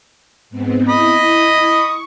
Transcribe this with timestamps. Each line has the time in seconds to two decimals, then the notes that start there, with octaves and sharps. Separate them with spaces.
0.50 G#2 B3 C4
0.89 E4 D#5 B5 D#6
1.63 C#6